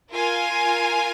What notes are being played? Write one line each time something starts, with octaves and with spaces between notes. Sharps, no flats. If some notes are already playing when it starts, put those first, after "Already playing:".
F4 A#4 F5 G#5